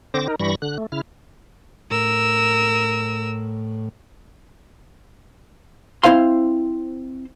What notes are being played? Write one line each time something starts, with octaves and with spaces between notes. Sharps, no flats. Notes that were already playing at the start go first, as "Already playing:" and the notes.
D3 C4 C5 D6 A#6
D#4 A#4
G2 E3 G3 B5 C#6 A#6
D3 F#6
A3
C#3 E4 F6
A2 A#4 E6
C4 E4 C5 F5 C6